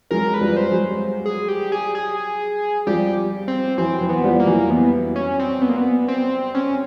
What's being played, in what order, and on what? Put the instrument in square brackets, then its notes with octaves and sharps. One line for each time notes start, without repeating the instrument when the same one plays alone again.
[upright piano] F#3 G#3 [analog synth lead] A#4
[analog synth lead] B4
[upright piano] F3 G3
[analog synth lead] C5
[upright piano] F#3 G#3
[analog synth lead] G#4
G4
G#4
G#4
[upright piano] F3 G3 [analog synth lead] G4
[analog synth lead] C4
[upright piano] E3 F#3 [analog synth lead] C4
[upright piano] E3 F#3
[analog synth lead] B3
[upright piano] F3 G3
[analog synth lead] A#3
[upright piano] E3 F#3
[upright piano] E3 [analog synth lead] B3
[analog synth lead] C#4
C4
B3
A#3
B3
C4
C#4